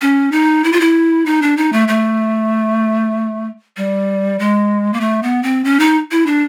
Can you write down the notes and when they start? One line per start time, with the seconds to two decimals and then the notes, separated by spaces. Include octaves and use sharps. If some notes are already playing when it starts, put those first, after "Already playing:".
0.02 C#4
0.32 D#4
0.64 E4
0.72 F4
0.81 E4
1.26 D#4
1.42 D4
1.57 D#4
1.73 A3
1.88 A3
3.77 G3
4.39 G#3
4.93 A#3
5.01 A3
5.23 B3
5.43 C4
5.64 C#4
5.80 D#4
6.11 E4
6.26 D4